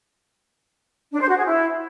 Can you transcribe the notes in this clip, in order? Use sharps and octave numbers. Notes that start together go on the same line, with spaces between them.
D4
C5
F#4
G#4
E4